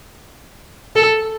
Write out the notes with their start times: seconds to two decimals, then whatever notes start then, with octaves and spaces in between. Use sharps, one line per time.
0.96 A4